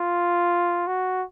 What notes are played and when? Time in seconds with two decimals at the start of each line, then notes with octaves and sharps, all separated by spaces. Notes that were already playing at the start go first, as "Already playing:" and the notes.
Already playing: F4
0.87 F#4